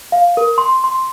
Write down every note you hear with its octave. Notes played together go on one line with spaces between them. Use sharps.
F5
A#4
C6
C6